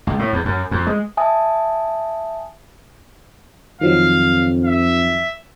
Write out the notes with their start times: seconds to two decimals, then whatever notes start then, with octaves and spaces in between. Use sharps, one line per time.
0.07 C#2
0.19 A2
0.33 E2
0.45 F#2
0.71 F2
0.87 G#3
1.17 E5 G#5 A5 D#6
3.81 F2 D#3 F3 F#3 F5
4.65 E5